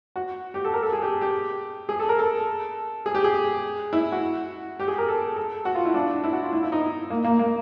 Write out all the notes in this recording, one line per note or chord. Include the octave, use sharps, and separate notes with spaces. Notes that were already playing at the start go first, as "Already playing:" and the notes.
F#4
G4
A4
A#4
A4
G#4
G4
G4
G#4
A4
A#4
A4
G#4
G4
G#4
E4
F#4
G4
G#4
A#4
A4
A4
F#4
F4
E4
D4
E4
F#4
F4
E4
E4
D#4
A#3
A#3
A#3